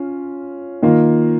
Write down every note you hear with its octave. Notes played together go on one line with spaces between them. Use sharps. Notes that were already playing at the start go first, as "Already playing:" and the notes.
Already playing: C#4 F4
D#3 A#3 F4